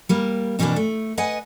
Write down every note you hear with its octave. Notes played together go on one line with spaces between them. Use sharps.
G3 A#3
F2 B2 E3 G3 A#3 D4
A3
B4 D#5 F#5 G#5